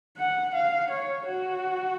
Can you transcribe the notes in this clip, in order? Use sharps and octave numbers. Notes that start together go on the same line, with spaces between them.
F#5
F5
C#5
F#4